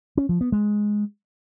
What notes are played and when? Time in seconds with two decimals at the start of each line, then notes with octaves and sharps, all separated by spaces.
0.17 C#4
0.29 F3
0.41 B3
0.52 G#3